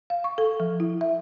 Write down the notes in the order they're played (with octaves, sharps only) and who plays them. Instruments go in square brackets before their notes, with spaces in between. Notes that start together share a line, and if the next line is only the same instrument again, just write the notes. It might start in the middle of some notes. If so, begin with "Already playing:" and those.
[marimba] F5
C#6
A4
F3
E4
E5